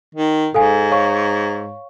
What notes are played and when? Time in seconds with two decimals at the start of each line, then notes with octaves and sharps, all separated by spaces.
0.15 D#3
0.54 G#2 A4 F5 G#5
0.91 C#5 F5 C#6